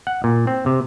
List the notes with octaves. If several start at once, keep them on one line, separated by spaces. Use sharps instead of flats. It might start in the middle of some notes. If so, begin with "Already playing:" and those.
F#5
A#2
C4
C3